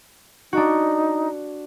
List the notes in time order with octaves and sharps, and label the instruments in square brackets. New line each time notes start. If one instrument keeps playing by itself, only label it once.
[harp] D4 F#4 [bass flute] D#4